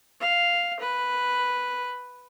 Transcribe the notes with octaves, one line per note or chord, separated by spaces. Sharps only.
F5
B4